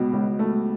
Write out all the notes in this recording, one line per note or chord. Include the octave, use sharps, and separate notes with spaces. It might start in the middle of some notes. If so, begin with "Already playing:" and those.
Already playing: C#2 B2
C#2
A3